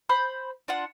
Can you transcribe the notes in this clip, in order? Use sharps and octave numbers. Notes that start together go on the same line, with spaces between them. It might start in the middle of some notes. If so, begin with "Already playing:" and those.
C5 B5 G6
D4 F4 F#5